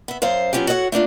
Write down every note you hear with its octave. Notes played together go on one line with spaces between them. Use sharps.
B3 E5
F#2 C5 F5
F#3 B3 C#4 F4 G4
F#4 A4 C#5 D#5 F#5
A3 A#3 D4 F4